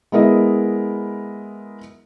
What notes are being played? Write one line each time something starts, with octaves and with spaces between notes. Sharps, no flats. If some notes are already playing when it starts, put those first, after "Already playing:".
G#3 B3 E4 A#4 D#5